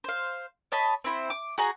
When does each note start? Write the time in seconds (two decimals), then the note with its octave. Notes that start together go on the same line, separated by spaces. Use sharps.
0.04 C5 F5
0.72 C#5 D#5 A5 B5
1.04 C4 E4 C5
1.30 D6
1.58 F#4 G#4 F#5 A#5